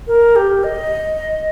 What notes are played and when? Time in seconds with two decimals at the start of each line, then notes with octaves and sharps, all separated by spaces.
0.07 A#4
0.36 G4
0.64 D#5